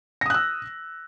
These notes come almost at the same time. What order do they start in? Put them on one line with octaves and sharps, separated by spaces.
A#6 D#6 F#6 E6